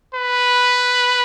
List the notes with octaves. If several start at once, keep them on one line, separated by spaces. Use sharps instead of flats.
B4